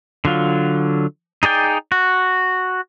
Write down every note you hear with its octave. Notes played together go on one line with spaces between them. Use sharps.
D3 F#3 F4
D#4 G#4 D5 G5
F#4